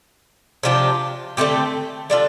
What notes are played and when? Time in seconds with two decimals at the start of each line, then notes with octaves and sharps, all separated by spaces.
0.63 C3 F3 D4 G4
1.37 D3 A3 C4 G4
2.10 G3 D4 F4 A4